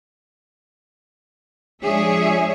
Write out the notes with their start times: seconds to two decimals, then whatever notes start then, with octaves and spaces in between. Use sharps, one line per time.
1.82 F3 G#3 D4 G#4 C#5 E5